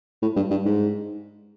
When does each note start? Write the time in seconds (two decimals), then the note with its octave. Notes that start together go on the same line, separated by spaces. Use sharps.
0.22 A2
0.36 G2
0.51 G2
0.65 G#2